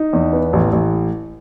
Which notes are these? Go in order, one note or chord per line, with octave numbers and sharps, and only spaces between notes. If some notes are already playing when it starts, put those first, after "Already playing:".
Already playing: D#4
E2
B3
A1
A1